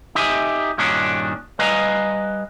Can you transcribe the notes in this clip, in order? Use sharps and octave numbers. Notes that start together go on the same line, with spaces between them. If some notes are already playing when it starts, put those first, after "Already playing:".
D#4 G4 E5 G#5
G2 A#2 D#3 C#4 D4 F#4
G3 B4 D#5 F5 G#5 A#5